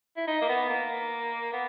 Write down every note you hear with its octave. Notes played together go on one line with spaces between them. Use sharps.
E4
D#4
A#3
B3
A#3
B3